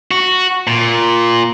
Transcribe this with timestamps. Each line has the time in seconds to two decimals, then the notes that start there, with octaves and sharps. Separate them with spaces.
0.11 F#4
0.67 A#2